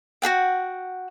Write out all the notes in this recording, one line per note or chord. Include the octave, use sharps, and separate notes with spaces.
F#4 G#4 F#5 G5